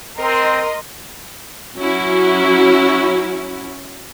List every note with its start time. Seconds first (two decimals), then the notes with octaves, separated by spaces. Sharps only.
0.18 C4 A#4 D#5 C6
1.78 F#3 C#4 E4 F#4